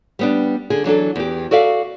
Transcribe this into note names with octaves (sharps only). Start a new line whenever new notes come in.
G3 B3 D4
D3 G#4
E3 F#3 D4 A4
E2 G4
F#4 A4 D5 E5 F5